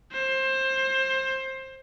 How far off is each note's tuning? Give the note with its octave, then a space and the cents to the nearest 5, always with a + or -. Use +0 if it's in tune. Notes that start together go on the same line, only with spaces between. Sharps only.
C5 +20